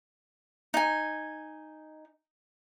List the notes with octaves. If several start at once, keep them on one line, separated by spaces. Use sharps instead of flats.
D#4 G#5